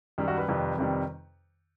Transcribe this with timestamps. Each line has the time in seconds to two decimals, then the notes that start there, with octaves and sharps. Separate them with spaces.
0.18 F#2 D#3 G3
0.28 F#4
0.38 B4
0.48 F2 C3 D#3 G3
0.77 F2 C3 D#3 G3